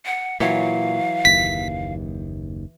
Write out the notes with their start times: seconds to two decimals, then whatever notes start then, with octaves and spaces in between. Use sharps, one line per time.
0.06 F#5
0.40 A#2 E3 F#3 C#5 F5
1.25 F#1 D#2 B6